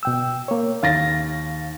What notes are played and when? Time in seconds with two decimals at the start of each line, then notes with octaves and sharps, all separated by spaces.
0.03 B2 G5 E6
0.48 A#3 C#5
0.83 D#2 F5 A6 A#6